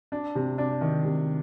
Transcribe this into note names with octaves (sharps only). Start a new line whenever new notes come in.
D4
C3
D4
D#3
C3